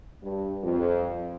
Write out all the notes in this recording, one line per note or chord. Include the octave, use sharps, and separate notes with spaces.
G2
F2